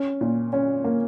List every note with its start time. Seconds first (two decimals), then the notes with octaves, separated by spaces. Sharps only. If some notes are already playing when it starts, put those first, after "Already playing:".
Already playing: C#4
0.21 A#2
0.53 C#4
0.84 A#3